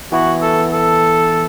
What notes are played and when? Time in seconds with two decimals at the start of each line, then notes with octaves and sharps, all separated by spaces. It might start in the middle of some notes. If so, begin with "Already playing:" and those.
0.12 E3 B3 E4 F#4
0.42 A4
0.73 A4